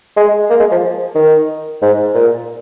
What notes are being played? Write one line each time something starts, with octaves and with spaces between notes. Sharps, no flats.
G#3
A#3
G#3
F3
D#3
G#2
A#2